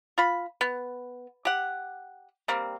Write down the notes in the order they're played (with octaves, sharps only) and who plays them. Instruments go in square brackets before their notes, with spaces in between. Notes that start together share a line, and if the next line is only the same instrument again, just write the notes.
[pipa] F4 B5
B3
G4 F#5
G3 A#3 C4